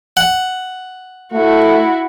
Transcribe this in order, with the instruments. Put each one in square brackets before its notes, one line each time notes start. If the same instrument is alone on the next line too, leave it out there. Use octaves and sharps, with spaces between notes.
[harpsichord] F#5
[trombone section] A3 [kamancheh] E4 F#4